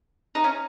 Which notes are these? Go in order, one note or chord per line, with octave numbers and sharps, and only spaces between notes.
D#4
C#4